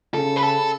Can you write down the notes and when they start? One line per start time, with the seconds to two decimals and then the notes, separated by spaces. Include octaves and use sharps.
0.14 C#3 A4
0.36 B4
0.43 A4